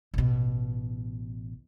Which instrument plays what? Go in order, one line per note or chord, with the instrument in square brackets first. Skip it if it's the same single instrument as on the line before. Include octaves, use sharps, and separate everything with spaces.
[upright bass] A1 B2